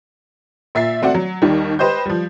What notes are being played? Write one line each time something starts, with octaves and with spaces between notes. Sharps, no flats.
A#2 E5 A6 C7
A3 C4 F#4 D5 F#5
F#3
D#2 D#3 G3
G4 B4 C5 D#5 C6 G6
F3 G3